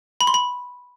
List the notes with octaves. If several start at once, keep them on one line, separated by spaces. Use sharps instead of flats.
B5
C6
B5